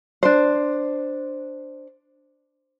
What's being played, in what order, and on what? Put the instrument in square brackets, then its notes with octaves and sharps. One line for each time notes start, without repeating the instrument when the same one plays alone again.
[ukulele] D4 C5